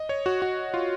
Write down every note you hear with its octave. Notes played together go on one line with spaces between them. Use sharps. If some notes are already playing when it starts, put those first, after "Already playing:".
Already playing: D#5
C#5
F#4
F#4
F4